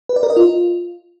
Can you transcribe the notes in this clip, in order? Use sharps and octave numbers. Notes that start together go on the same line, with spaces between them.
B4
D5
A#4
D#5
F4